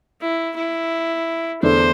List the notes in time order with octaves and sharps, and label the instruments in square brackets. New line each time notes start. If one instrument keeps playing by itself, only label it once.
[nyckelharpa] E4
E4
[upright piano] E2 D3 A3 D4 A4 [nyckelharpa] C5